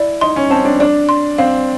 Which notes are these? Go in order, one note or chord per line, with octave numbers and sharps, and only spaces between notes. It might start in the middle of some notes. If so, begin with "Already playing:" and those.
Already playing: E4 D5
D#4 C6
C#4
C4 A5
D4
D4 D5
C6
C4 F5